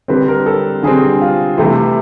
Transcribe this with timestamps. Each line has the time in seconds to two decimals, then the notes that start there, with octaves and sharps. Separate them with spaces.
0.08 D3 G3 C4 B4
0.28 A#4
0.46 A4
0.83 D3 G3 C4 G#4
1.21 F4
1.58 C3 E3 A3 E4